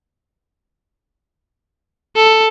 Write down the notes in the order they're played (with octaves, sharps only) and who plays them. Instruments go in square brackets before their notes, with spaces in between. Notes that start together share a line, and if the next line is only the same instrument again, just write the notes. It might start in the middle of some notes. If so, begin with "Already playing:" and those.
[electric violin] A4